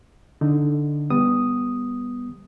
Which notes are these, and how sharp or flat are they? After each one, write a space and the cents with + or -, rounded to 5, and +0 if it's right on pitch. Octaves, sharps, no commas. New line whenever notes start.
D3 +0 D#4 +0
G3 +20 B3 -5 D#6 +0